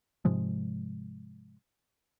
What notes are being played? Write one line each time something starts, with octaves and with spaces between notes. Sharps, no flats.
G#2 C3 F3 G#3